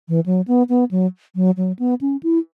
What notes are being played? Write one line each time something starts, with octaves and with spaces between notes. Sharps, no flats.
E3
F#3
B3
B3
F#3
F#3
F#3
B3
C#4
E4